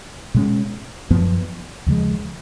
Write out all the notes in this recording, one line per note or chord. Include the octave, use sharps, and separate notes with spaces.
B2 G#3 C#4
F#2 F3 B3
D#2 C#3 F3 G#3